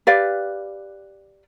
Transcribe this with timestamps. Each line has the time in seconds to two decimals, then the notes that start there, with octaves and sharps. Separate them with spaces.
0.07 G4 B4 D5 F5